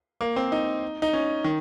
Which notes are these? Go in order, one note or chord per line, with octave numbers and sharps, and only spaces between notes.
A#3
C4
D#4
D#4
C#4
D#3